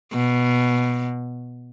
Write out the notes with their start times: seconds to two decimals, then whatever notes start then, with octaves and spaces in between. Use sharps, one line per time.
0.13 B2